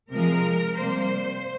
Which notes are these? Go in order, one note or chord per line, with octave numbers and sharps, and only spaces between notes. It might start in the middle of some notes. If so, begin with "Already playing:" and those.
C3 F3 G#3 A#4
C3 G3 A#3 C5